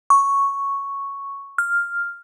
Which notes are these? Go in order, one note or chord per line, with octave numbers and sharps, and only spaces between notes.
C#6
F6